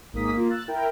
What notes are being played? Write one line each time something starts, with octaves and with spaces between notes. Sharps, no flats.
G#1 G#2 A#3 D#6 B6
A#3 F4
E6 F#6 A6
E4 A#4 G5